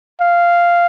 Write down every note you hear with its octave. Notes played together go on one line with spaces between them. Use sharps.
F5